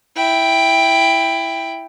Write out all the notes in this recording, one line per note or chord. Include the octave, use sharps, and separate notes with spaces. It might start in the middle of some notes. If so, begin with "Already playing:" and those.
E4 G5